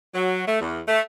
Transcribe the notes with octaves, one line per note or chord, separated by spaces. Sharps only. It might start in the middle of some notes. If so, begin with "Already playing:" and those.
F#3
A3
E2
A3